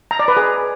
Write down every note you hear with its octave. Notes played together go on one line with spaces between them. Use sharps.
A#5
D5
B4
G#4